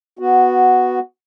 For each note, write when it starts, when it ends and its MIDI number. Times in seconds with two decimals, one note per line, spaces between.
0.19 0.99 59
0.19 0.99 66